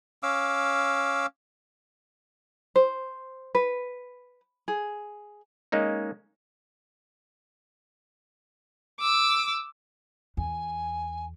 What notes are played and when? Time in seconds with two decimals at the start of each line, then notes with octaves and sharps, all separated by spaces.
0.23 C#4 F5 D6 E6
2.76 C5
3.55 B4
4.68 G#4
5.72 G#3 A#3 C#4 D#4
9.00 D6 E6
10.37 E2 G#5